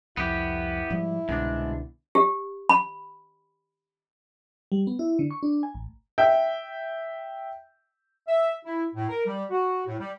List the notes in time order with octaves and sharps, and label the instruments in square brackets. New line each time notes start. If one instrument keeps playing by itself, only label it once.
[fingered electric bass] C2 F2 [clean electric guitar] B3 G4 [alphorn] E4
[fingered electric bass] G#2 F3 G3
[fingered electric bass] C2 B2 D3 [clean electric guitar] G#2 D4
[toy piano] G4
B5
[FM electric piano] G3
B3
E4
D3
C#6
D4
G#5
A1
[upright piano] E5 G5
[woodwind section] E5
E4
A2
A#4
G3
F#4
A2
G3